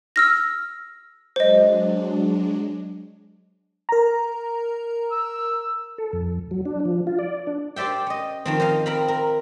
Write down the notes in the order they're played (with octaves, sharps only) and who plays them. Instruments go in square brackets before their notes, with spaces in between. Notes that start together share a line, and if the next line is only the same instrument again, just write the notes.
[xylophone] E6 F6 A#6
[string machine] F#3 G#3 D4 [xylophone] C5 D#5
[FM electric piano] A#4 A#5
[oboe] E6
[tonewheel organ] A4
F2
F#3
D4
F3
F4
D5
D4
[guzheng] G4 C5 D5 E5 G5
C#4 D#5
D#3 F3 C4
C5 D#5 F5
C4 A#4 F5 B5
A#4